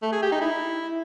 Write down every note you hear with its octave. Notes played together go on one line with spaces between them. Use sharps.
A3
G#4
G4
D#4
E4